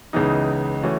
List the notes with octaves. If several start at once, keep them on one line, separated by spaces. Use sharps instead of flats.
C#2 C#3 E3 B3 D#4
E3 A3 C#4 F#4